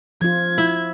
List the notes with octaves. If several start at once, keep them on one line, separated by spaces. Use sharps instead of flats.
F3 F4 G#6
E4